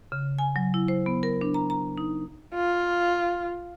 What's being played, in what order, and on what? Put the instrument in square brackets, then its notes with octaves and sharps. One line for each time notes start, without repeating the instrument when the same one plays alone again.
[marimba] C#3
G#5
F#3
E4
C5
B3
A#4
D4
A#5
A#5
D#4
[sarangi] F4